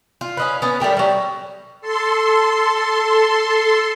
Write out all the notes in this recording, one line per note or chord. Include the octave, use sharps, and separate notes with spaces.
F4
C#4 D#4 B4
B3 C#4
G3 A3 G4 A#4
F#3 G3
A4 C6